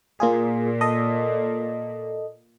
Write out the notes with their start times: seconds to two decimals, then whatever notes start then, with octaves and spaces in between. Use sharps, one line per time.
0.20 A#2 A#3 F4 G#4
0.81 A4 D#5